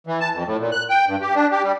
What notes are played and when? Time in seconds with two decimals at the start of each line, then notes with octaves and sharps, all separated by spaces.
0.07 E3
0.21 A5
0.33 F2
0.46 A2
0.59 A#2
0.72 F#6
0.90 G5
1.07 G2
1.22 G4
1.35 D4
1.51 G4
1.63 G3